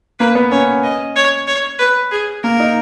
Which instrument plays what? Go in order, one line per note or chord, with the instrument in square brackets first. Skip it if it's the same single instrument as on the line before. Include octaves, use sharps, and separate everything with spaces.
[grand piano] A#3 [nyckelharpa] B4
[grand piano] B3
[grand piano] C#4 [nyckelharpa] C#5
[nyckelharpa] D#5
C#5
C#5
B4
G#4
[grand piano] A#3 [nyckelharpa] A#4
[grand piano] D#4